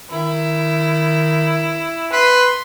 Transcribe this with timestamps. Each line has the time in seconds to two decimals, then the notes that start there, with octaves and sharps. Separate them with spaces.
0.11 D#3 E4
2.12 B4 C6